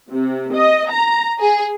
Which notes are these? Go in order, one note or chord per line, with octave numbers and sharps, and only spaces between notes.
C3
D#5
A#5
G#4